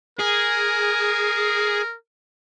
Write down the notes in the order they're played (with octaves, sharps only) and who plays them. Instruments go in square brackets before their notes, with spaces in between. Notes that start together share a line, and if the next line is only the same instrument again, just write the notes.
[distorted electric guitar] G#4 [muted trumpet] A#4